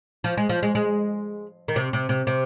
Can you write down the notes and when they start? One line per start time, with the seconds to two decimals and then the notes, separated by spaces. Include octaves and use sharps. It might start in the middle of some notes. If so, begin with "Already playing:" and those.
0.24 F3
0.37 G#3
0.49 F3
0.63 G#3
0.75 G#3
1.68 D#3
1.76 C3
1.93 C3
2.09 C3
2.27 C3